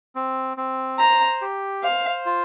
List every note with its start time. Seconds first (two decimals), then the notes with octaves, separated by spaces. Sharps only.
0.15 C4
0.57 C4
0.99 C5 A#5
1.41 G4
1.83 C5 F5
2.26 F4